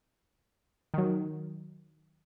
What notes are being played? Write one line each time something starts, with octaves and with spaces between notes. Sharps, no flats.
D#3 F#3